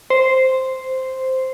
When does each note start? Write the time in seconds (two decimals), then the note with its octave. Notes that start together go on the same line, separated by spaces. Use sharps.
0.10 C5